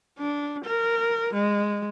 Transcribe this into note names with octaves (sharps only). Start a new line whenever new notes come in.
D4
A#4
G#3